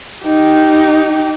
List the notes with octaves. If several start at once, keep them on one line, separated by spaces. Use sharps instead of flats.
D#4 G4